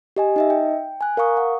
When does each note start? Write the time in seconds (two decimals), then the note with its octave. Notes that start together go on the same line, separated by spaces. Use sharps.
0.16 G4 D#5 G#5
0.36 D#4 D#5 E5
0.50 G5
1.01 G#5 F#6
1.17 A#4 F5 A#5 C#6 D#6
1.37 F#5